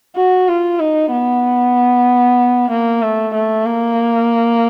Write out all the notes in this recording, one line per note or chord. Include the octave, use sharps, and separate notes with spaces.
F#4
F4
D#4
B3
A#3
A3
A3
A#3